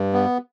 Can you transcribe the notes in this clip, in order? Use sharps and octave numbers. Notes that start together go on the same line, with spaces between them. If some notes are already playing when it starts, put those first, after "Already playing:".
Already playing: G2
B3